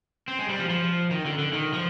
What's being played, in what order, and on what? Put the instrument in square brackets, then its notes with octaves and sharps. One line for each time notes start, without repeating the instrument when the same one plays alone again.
[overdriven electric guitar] C4
G#3
G3
F3
F3
D#3
D3
D3
D#3
F3